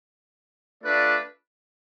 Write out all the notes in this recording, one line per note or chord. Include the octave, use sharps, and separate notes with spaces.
A3 D4 F4 B4 D5